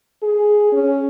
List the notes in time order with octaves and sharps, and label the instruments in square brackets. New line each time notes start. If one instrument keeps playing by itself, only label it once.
[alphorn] G#4
C#4